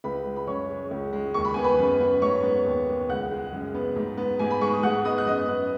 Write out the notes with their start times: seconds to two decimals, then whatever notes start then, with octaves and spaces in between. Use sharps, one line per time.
0.04 C#2 B4 B5
0.26 G#3
0.36 B5
0.47 F#2 C#5 C#6
0.69 G#3
0.91 C#2
1.13 G#3
1.34 D#2 C#6
1.45 B5
1.54 B3 G#5
1.64 B4 B5
1.79 F#2
2.00 B3
2.22 G#2 C#5 C#6
2.43 B3
2.66 D#2
2.88 G#3
3.09 C#2 F#5 F#6
3.31 G#3
3.53 F#2
3.74 B3
3.96 G#2
4.17 B3
4.39 G#2 G#5
4.51 B5
4.61 G#3 C#6
4.73 D#6
4.83 G#2 F#5 F#6
5.05 B3 D#5 D#6
5.18 F#6
5.27 F#2 D#5 D#6
5.48 B3